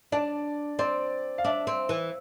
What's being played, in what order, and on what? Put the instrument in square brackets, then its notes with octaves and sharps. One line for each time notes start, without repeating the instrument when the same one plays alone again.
[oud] D4 [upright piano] D5
[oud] C4 [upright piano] D5
[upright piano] F5
[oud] D4 [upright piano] E5
[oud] C4
E3